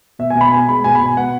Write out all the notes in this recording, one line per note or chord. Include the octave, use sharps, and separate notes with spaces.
B2 E5
G#5
B2
B5
B3 G#5
G#3 B5
B2 G#5
B5
B2
G#5
B3 F#5